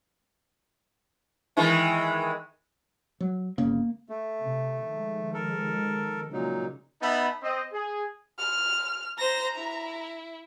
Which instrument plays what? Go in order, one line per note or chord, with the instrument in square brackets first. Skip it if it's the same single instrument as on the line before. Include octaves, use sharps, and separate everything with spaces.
[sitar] D#3 E3 G#3
[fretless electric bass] F#3
[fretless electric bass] G1 C#3 [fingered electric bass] A#3
[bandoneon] A3
[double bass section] C3
D#3 F3 G#3
[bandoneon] A4 A#4
[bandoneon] A#2 F#3 D#4 [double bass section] C#3
[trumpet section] B3 D#4 E5 A5 B5
C4 D#5
G#4
[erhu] F6
[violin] C5 A#6 [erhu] A#5
[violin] E4